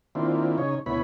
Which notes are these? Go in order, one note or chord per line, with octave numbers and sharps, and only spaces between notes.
D#3 A#3 C4 D4 E4 F4
C#3 D#4 C#5
D2 B2 B3 E4 C#5 B5